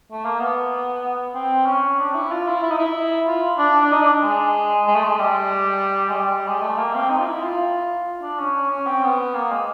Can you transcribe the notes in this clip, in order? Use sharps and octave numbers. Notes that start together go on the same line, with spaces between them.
A3
A#3
B3
C4
C#4
D4
E4
F4
E4
E4
D#4
E4
F4
D4
D4
D#4
D4
G#3
G#3
A3
G#3
G3
G#3
G3
G#3
A3
A#3
C4
D#4
F4
E4
F4
D4
C#4
C#4
C4
B3
A#3
G#3